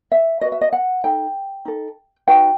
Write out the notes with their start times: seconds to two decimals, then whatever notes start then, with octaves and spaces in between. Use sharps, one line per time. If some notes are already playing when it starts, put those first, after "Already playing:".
0.12 E5
0.41 F#4 B4 D#5
0.52 E5
0.61 D#5
0.73 F#5
1.04 D#4 A4 G5
1.65 D#4 A4
2.28 D#4 F#4 B4 G5